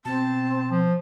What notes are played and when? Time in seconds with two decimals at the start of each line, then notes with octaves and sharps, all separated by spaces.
0.05 B2 C4 A5
0.69 F3